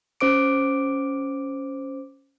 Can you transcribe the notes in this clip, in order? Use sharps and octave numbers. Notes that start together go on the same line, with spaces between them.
C#4 C5 D6 D7